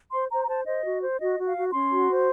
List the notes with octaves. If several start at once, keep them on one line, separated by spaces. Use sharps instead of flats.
C5 C6
C5 A#5
A#5
C5 A5
C5 D#5
F#4
C5
F#4 D#5
F#4
F5
F#4
C#4 C6
F#4
C5